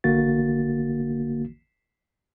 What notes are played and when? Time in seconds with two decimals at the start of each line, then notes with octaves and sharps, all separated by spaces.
0.04 A1 D3 A#3 F#4 A6